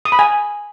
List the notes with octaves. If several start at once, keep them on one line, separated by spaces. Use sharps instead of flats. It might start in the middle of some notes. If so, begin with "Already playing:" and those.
D#6
B5
G#5